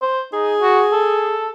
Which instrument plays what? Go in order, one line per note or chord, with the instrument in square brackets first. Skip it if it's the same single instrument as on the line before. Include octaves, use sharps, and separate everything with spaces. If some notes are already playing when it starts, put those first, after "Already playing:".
[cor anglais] C5
[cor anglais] D#4 [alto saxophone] G#4
[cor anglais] F#4
A4